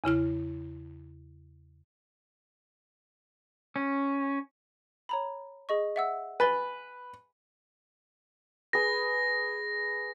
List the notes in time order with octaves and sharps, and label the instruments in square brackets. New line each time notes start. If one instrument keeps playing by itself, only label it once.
[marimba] E2 C#3 E4 F6
[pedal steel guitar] C#4
[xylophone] C#5 A#5 B5
G#4 D#5 C#6
E5 F#5 E6
[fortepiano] B4 [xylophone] G#5 A6 G7
[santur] G#4 B4 [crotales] A#6